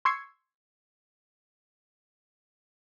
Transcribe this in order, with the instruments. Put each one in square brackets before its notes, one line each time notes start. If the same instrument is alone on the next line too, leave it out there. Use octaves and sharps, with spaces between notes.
[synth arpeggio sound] C6 C#6 E6 G#6 C7 C#7